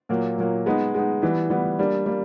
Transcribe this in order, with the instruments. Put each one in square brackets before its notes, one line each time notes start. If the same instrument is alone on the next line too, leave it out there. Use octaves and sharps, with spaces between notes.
[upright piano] A#2 F#3 A#3
A#2 F#3 A#3
G#3 B3 D#4
G#3 B3 D#4
E3 G3 B3
E3 G3 B3
G3 A#3 D4
G3 A#3